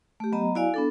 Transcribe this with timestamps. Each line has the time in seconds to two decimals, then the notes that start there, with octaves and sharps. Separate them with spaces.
0.20 A3 G4
0.32 F#3 B3 D#5 A#5
0.55 E4 F#4 D5 F5 G#5
0.74 B3 D4 A4